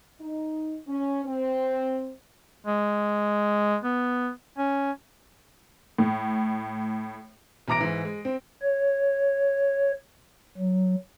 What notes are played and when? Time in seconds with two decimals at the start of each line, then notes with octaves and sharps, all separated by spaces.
0.21 D#4
0.87 C#4
1.25 C4
2.67 G#3
3.84 B3
4.58 C#4
5.98 A2
7.68 B1 E3 A#5 D6 A#6 D7
7.80 G#2 E3
8.05 G#3
8.25 C4
8.62 C#5
10.57 F#3